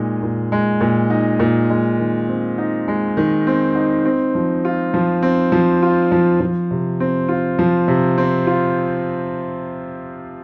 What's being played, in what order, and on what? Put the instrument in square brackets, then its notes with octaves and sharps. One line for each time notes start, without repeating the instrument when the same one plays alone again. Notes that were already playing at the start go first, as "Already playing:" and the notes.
Already playing: [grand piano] A#2 G#3 D#4
A#2
G#3
A#2
D#4
A#2
G#3
D#3
C4
D#4
G#3
D#3
C4
D#4
C4
F3
F4
F3
C4
F3
F4
F3
F3
C3
C4
F4
F3
C3
C4
F4